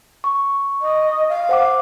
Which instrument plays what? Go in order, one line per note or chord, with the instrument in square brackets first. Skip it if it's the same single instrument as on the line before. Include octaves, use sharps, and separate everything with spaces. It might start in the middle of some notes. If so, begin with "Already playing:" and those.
[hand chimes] C#6
[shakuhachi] D#5
F5
[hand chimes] C5 F#5 D6